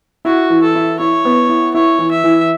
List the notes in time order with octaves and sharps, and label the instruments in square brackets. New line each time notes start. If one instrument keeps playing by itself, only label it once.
[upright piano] E4 [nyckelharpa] F#4
[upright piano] E3
[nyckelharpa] A4
[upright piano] E4
[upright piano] E4 [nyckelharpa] C#5
[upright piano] B3
E4
[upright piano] E4 [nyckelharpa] C#5
[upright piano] E3
[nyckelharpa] E5
[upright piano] E3